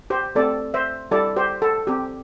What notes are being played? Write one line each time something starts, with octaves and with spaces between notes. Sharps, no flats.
G4 C5
A3 C4 G4 A4 D5
C5 E5
G3 E4 G4 A4 D5
G4 C5
A4
C4 G4